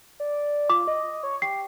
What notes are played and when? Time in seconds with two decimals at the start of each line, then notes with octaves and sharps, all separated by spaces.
0.20 D5
0.70 F4 D6
0.87 D#5
1.23 C#5
1.42 G4 C7